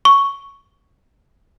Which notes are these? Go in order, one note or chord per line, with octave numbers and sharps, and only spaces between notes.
C#6